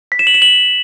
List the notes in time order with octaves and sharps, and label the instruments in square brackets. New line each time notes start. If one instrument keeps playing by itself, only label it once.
[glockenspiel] B6
E7
F#7
E7
F#7